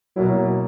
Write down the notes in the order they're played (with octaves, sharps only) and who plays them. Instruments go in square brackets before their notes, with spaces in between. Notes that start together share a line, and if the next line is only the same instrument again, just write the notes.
[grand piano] B2 A#3 E4 [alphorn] F#3